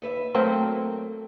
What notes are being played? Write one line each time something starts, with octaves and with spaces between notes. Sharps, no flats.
D#2 B4 E5
F#3 A3 A#3 C4